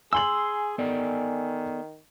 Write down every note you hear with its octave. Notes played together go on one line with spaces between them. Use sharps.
G#4 G#5 C6 E6 F#7
D#3 B3 A4 D5